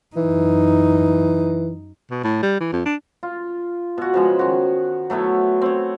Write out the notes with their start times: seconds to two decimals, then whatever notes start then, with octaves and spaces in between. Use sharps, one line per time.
0.16 F#2 E3 D#4
2.10 B2
2.24 A2
2.42 G3
2.60 E3
2.73 F2
2.85 D4
3.23 F4
3.98 B2 F#4
4.14 C#3 F3 G#3
4.39 D#3 F#4
5.10 F#3 A3 B3 E4
5.61 C4 C#5